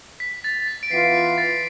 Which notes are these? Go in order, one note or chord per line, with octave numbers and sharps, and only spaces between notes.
B6
A6
A6
B6
D7
E3 B3 F4 C7
B6
A6